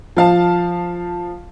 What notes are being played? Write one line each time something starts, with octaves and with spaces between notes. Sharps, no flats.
F3 F5 A5